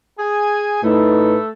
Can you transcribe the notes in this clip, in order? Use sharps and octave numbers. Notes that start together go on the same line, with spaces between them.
G#4 G#5
A2 A3 D#4 A4 B4